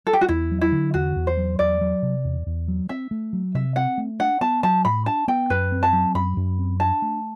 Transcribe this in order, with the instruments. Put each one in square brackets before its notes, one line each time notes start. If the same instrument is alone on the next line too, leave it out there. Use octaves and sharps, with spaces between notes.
[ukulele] A4
G4
F#4
[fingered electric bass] E2 [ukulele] E4
[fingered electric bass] F#3
[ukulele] E4
[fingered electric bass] D3
[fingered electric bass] E2 [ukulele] F#4
[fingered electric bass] E2
[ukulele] C5
[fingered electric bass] F#3
[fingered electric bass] E2 [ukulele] D5
[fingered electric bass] F#3
C3
E2
E2
F#3
[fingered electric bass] C4 [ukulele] E5
[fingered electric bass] A3
F#3
[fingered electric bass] C3 [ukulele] E5
[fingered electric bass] C4 [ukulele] F#5
[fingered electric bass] A3
[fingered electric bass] D4 [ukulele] F#5
[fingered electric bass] B3 [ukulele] A5
[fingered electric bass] F#3 [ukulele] A5
[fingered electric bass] A2 [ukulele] B5
[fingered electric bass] D4 [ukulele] A5
[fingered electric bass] B3 [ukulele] G5
[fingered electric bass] F#2 [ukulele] B4
[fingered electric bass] C4
[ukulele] A5
[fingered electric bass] F#3
[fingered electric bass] F#2 [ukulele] B5
[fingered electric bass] F#2
C4
[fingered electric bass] D4 [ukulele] A5
[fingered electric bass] A3